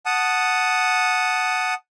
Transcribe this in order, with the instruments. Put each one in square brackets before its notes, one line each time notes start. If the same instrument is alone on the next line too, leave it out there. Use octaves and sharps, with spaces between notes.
[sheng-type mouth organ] F#5 A5 D#6